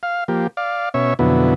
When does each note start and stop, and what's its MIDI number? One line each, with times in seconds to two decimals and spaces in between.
0.03 0.24 77
0.28 0.47 53
0.28 0.47 58
0.28 0.47 67
0.57 0.89 74
0.57 0.89 77
0.94 1.14 47
0.94 1.14 61
0.94 1.14 73
0.94 1.14 76
1.19 1.54 41
1.19 1.54 47
1.19 1.54 50
1.19 1.54 54
1.19 1.54 59
1.19 1.54 64